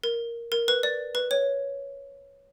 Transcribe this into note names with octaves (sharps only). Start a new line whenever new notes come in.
A#4
A#4
B4
D5
B4
C#5